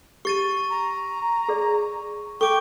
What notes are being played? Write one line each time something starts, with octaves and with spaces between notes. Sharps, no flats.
G4 C#6 A6 D#7
A#5
G#4 D5
A4 G5 C#6 D6